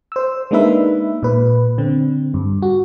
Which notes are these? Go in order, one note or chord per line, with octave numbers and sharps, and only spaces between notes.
C5 E6
G#3 A#3 D4 D#4 B4 E5
A#2 B4
D3 C4
G2
F#4